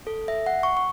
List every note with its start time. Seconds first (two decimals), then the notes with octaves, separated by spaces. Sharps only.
0.07 A4
0.28 E5
0.46 F#5
0.63 C#6
0.77 C#6